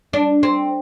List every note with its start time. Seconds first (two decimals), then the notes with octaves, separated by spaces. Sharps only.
0.13 D4
0.43 C4